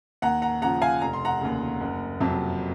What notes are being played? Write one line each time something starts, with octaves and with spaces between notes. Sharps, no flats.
D#2 F#5 A#5
F#5 A#5
C#3 F3 F#5 A#5
F5 G#5
F1 A#5
C6
F#5 A#5
D#2 C#3
F#1
F2 C3 F#3